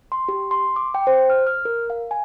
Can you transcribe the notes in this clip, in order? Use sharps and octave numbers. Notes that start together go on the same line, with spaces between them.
C6
G4
C6
D6
G5
C5
F6
F6
A#4
F5
G#5